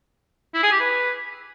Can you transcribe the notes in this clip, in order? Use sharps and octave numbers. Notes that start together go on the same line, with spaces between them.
E4
G#4
G4
B4